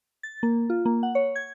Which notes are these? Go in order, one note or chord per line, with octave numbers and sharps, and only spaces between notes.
A6
A#3
F4
A#3
F#5
C#5
G#6